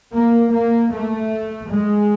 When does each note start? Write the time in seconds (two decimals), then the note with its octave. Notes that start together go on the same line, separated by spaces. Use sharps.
0.14 A#3
0.53 A#3
0.93 A3
1.71 G#3